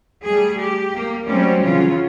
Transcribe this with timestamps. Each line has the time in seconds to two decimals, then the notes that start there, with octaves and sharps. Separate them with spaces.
0.23 G3 A3 G#4
0.59 G4
0.94 A#3
1.26 F#3 G3 A3 C4 C#4
1.62 C#3 E3 F#3 C#4 F4